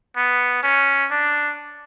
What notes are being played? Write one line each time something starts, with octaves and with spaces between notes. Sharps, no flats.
B3
C#4
D4